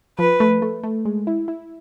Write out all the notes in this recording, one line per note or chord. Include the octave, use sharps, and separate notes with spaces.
F3 B4
A3
A3
A3
G#3
E4
E4